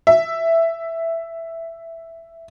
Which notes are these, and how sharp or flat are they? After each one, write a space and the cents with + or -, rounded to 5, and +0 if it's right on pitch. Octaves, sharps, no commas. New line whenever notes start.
E5 +5